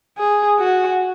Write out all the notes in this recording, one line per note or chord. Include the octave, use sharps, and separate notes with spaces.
G#4
F#4